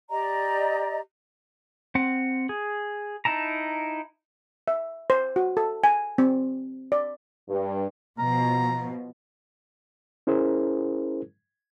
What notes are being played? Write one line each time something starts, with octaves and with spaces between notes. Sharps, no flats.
G4 D5 D#5 A#5
C4 F#5
G#4
D#4 E4 A5 A#5
E5
C5
F#4
A4
G#5
C4
D5
G2
B2 F3 A#5
C#4 E4 G#4 A#4 C5